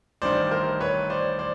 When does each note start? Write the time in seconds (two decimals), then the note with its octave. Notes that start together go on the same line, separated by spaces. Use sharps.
0.22 A1 G2 D#3 C5 D5
0.51 A#4 C5
0.80 B4 C#5
1.10 C5 D5
1.39 C5 D5